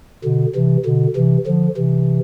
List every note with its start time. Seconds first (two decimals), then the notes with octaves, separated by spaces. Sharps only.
0.25 B2 D3
0.56 C3 E3
0.86 B2 D3
1.16 C3 E3
1.47 D3 F3
1.77 C3 E3